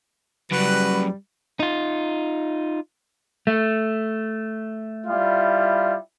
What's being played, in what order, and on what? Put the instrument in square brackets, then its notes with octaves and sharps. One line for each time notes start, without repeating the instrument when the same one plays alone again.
[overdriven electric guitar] F#2 C#3 [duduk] G3 [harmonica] F#4 B4
[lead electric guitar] D#4 F4
[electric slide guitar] A3
[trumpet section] G3 E4 F4